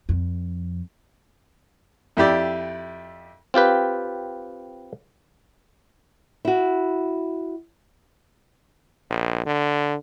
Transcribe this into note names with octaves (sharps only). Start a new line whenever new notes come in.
F2
F2 E4 G4 D5
C4 F4 G4 B4
E4 F#4
A#1
D3